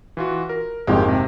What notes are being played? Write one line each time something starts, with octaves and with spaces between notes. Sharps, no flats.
E3 F4 F#4
A#4
G#1 F2 G#3 A#3 G4
C3